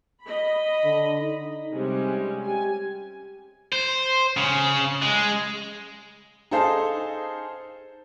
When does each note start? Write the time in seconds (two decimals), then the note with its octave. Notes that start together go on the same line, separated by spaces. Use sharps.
0.24 D#5 B5
0.85 D3
1.21 D#4
1.73 C3 G3 G#3 C#4
2.45 G4 G#5
3.72 C5
4.37 C#3
5.02 G#3
6.51 D#4 G#4 A4 C5 F5 A5